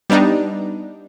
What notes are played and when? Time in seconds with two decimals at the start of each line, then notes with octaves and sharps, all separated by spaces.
0.10 G3 B3 D4 D#4